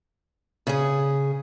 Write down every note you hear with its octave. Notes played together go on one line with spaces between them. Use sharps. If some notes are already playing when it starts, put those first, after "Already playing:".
C#3 G#4